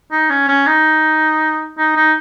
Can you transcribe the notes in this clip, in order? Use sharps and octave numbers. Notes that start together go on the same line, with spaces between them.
D#4
C#4
C#4
D#4
D#4
D#4